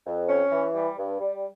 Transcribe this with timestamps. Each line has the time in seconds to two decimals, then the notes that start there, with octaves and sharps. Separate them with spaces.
0.05 F2
0.28 C#4
0.51 E3
0.74 G3
0.98 G2
1.20 G3